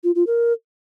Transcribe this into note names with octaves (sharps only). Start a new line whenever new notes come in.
F4
F4
A#4